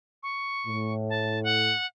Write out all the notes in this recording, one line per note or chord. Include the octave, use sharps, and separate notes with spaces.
C#6
A2
A5
F#5